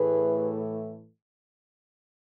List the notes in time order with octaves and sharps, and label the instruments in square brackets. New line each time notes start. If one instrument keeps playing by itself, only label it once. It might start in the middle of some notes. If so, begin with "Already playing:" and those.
Already playing: [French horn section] A2 E3 A3 G#4 B4